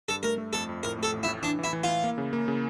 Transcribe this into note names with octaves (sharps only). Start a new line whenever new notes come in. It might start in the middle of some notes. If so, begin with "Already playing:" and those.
G2 A4
A3 A#4
A3
F2 A4
F2
A2 A#4
A3 A4
A1
E4
A2
E3 D4
E3 E4
E3
F4
E4
A#3
C#3
A#3
C#3